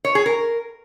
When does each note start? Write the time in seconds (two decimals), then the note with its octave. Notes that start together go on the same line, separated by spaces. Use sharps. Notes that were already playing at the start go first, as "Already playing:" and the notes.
0.05 C#5
0.15 G#4
0.26 A#4